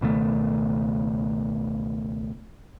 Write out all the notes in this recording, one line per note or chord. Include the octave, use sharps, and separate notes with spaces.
C#2 B2 D#3 A3